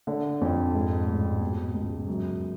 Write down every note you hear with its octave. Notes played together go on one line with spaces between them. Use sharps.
D3
F2
G#2
A1
B2
C#2
F#2